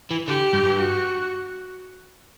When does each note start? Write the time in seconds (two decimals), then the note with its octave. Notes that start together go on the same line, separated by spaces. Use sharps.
0.11 E3
0.28 D3 G4
0.53 G2
0.65 G2
0.78 F#4